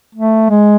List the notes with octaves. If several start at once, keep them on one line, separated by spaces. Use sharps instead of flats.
A3
G#3